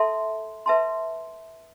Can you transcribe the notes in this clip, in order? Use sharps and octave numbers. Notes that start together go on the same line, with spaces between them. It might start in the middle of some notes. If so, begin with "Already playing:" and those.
Already playing: A4 E5 A5 C6
B4 E5 A5 C6